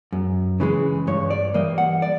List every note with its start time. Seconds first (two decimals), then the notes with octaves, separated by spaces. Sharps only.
0.12 F#2
0.60 C#3 E3 G#3
1.07 G2 C#5
1.30 D5
1.54 E3 G3 A#3 D#5
1.78 F#5
2.02 D5